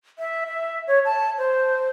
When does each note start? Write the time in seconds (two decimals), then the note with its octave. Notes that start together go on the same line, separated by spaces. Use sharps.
0.19 E5
0.47 E5
0.88 C#5
1.05 A5
1.38 C5